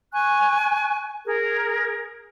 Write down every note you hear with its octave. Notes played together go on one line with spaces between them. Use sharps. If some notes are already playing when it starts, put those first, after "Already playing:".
G#5 C#6 F#6
G#4 A#4